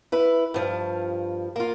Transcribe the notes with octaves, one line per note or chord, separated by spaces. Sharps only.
E4 B4
G2 F3
A#3 F4